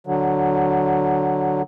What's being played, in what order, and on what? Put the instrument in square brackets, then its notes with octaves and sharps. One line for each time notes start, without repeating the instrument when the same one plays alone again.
[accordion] D3 F#3